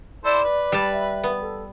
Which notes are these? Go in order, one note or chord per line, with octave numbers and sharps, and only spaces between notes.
E4 A4 C5 D5
B4
G3 A5
E5
B3
A4